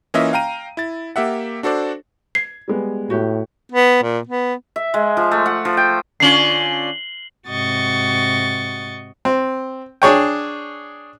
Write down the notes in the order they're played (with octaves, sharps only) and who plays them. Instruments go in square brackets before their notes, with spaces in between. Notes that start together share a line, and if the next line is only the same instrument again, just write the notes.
[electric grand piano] E3 A#3 C#4 F4 D#5 E5
F5 G5 A#5 D#7
E4 A6
A#3 G4 E5 F#5
D4 F#4 A4 C5 D5
[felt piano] G#6 [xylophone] C7
[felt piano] G3 G#3 B3
[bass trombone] A2 [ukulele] F#4 G4
[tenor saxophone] B3
A#2
B3
[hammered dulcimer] E5
G#3
F3
A3
F#5
F3
G5
[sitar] D3 C#4 F4 [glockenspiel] C7 F#7 G7
[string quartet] G#2 C3 F#4 D#5 C#6 A6
[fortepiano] C4
D4 G#4 C#5 G5